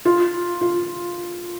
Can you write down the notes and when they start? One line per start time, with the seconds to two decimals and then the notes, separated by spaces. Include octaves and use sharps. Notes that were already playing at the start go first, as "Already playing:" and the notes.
0.05 F4
0.61 F4